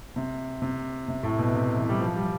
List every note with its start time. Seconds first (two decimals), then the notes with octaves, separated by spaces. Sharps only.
0.16 C3
0.62 C3
1.08 C3
1.23 A2
1.39 B2
1.54 C3
1.77 E3
1.89 G3
2.01 F3
2.16 G3